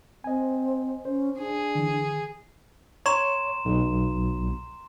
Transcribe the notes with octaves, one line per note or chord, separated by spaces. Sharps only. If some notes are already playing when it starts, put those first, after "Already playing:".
C4 D#5 G#5
C#4 C5
D4 G#4
D3 E3
C#5 A#5 C6 E7
B1